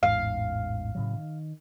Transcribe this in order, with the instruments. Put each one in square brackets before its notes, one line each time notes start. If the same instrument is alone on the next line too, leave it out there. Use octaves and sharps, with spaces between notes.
[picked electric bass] A1 E2 G#2 [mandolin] F5
[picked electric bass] A2 C#3 F#3
D#3